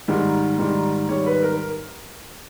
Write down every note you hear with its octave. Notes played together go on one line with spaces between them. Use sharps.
G#2 D#3 G3
G#2 D#3 G3
G#2 D#3 G3 C#5
B4
A#4